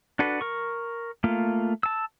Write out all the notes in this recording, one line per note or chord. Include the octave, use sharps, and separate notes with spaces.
D4 F#4 A4 B4
A#4 C#6
A3 A#3 F4
A5 E6